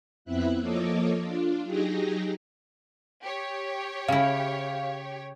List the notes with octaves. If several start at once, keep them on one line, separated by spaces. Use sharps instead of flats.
F2 B3 C4 E4 E5 F#6
F3 A#3 A4 C#5 D#5 D6
D4 F4
F#3 D#4 G4 G#4 A#6
G4 C#5
C#3 E4 F5